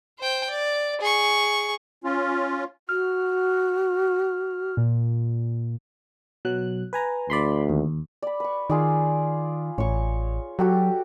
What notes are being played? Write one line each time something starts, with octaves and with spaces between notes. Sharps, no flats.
C5 G5
D5
G#4 C#6
C#4 F4
F#4 F6
A#2
B2 F#3 F#6
B4 G#5 A#5
D2 D5 B5 C6
D#2
D5 B5
B4 C#6
D#3 F4 G#4 D5
A1 C#5 C#6
F#3 F#4 G4 A4